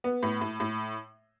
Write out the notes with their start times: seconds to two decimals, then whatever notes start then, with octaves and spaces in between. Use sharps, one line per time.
0.04 B3
0.23 A2
0.41 A2
0.60 A2